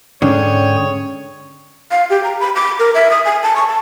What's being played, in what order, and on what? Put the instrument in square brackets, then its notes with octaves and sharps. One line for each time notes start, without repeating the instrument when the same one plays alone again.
[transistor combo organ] G#2 G5 D#6 [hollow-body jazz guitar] D3 [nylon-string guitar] C#4 [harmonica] C#5
[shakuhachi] F5
G4
A#5
B5
D6
A#4
E5
D#6
G#5
A5
C#6
A5